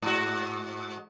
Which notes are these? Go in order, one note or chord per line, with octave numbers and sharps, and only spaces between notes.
G#2 F#4